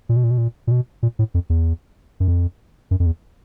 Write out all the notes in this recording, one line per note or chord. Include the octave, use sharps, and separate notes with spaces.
A#2
B2
A#2
B2
A#2
A#2
B2
A#2
A2
F2
E2
F#2
F2
F#2
F2
E2